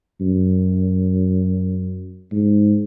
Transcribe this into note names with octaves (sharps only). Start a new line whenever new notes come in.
F#2
G#2